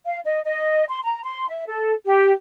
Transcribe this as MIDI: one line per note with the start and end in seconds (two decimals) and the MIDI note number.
0.06 0.19 77
0.25 0.40 75
0.45 0.85 75
0.89 1.00 84
1.05 1.20 82
1.24 1.46 84
1.49 1.64 76
1.67 1.93 69
2.05 2.31 67